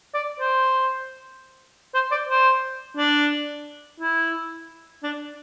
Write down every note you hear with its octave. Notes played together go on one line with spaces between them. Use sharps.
D5
C5
C5
D5
C5
D4
E4
D4